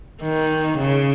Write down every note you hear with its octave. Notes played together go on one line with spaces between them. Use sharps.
D#3
C#3